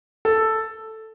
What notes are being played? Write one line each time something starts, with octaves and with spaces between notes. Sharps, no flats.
A4